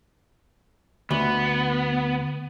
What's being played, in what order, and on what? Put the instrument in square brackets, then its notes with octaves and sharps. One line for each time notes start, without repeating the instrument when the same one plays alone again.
[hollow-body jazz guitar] D2 [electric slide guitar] B3